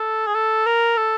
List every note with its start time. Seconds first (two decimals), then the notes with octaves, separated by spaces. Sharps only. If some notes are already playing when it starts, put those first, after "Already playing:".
Already playing: A4
0.27 G#4
0.34 A4
0.66 A#4
0.97 A4